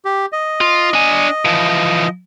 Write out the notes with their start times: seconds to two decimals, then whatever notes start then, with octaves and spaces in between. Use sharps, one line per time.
0.05 G4
0.32 D#5
0.61 F4
0.93 D4 G#5
1.45 E3 F3